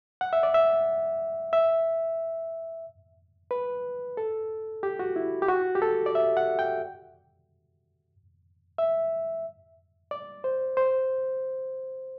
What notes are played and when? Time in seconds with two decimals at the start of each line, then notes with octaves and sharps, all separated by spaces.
0.21 F#5
0.33 E5
0.43 D5
0.54 E5
1.53 E5
3.51 B4
4.17 A4
4.83 G4
4.99 F#4
5.16 E4
5.42 G4
5.49 F#4
5.75 G4
5.82 A4
6.06 D5
6.15 E5
6.37 F#5
6.59 G5
8.78 E5
10.11 D5
10.44 C5
10.77 C5